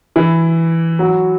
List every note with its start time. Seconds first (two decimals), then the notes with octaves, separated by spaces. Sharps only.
0.16 E3 E4
0.99 F#3 F#4